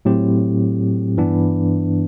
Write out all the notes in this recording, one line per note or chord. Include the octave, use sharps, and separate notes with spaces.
A2 F#3 C4 G4
G2 E3 B3 D4